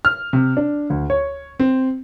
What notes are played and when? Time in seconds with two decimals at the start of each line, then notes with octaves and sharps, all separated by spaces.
0.05 F6
0.33 C3
0.57 D4
0.90 D2
1.10 C#5
1.60 C4